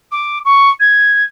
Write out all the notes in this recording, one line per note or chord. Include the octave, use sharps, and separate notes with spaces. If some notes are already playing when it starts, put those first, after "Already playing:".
D6
C#6
G#6